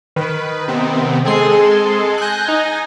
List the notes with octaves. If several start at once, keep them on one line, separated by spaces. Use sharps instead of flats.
D#3 B4
C3 B3 C4
G#3 C4 G#4 A4 C6
G#5 F#6 G6 A#6
D#4